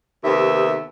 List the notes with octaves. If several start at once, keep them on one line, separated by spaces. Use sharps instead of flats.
D#2 C3 B3 A4 E5